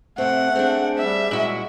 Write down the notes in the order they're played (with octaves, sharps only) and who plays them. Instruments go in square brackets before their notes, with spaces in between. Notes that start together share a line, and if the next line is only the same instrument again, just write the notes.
[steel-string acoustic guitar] C3 C4 [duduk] A3 [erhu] F#5
[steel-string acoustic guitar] C4 D4 [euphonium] G#4
[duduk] G3 [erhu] E5
[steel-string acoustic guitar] A#2 E4 F#4 [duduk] G#3